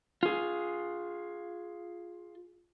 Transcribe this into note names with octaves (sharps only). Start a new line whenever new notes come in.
F4 G#4